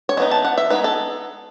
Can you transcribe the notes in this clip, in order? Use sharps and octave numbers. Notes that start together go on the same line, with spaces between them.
C#5
E3 B3 D#4 D#5
A5
F#5
E5
G#3 B3 D#4 B4
A4